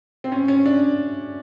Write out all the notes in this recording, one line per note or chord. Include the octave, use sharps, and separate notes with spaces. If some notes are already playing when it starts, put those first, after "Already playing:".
C4
C#4
C#4
D4